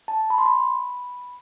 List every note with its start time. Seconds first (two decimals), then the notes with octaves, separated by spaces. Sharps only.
0.08 A5
0.30 B5
0.38 C6
0.46 B5